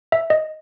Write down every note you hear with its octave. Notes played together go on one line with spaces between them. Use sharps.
E5
D#5